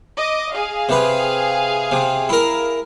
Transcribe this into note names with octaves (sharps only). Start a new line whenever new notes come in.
D#5 D6
G#4 F5
C3 B4
C3
E4 A#4